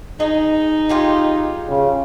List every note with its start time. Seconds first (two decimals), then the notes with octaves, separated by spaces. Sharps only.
0.20 D#4 G#4 D#5
0.89 F4 G4 G#4
1.69 C#3